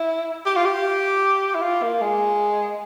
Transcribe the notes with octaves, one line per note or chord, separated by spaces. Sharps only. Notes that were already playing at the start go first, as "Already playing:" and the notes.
Already playing: E4
G4
F4
G4
E4
F4
A#3
G#3